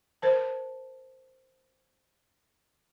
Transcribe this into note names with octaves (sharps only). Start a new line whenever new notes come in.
A#4 C5 A5